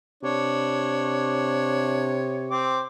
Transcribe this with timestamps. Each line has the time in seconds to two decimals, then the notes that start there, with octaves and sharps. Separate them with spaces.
0.23 C3 D4 C#5
2.51 C4 D6